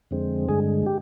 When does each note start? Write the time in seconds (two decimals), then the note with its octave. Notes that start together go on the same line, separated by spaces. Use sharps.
0.11 F2 D3 G#3 C4
0.48 G2 D3 G#3 G#4
0.86 G4